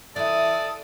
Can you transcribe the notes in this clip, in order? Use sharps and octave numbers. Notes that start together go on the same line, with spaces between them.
E3 E4 A4 D5 D#6